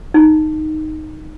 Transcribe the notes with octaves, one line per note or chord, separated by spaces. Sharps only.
D#4